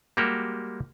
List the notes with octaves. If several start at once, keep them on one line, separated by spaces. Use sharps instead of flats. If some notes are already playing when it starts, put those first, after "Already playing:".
G3 G#3 A#3 F#4 G4